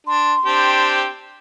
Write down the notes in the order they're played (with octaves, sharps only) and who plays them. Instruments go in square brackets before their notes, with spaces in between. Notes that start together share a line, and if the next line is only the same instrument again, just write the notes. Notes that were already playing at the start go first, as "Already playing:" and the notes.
[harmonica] D4 [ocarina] C6
[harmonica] C4 D4 G4